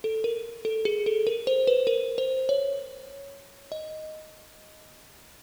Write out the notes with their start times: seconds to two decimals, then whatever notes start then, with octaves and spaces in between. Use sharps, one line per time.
0.04 A4
0.24 A#4
0.65 A4
0.85 G#4
1.06 A4
1.27 A#4
1.47 C5
1.67 B4
1.87 A#4
2.18 C5
2.49 C#5
3.72 D#5